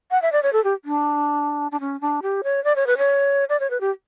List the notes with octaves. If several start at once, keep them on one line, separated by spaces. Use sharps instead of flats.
F#5
E5
D5
C#5
A4
G4
D4
D4
C#4
D4
G4
C#5
D5
C#5
B4
C#5
D5
C#5
B4
G4